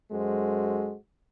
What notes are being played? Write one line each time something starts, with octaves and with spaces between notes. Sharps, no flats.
F#2 G#3 F#4 A4 C5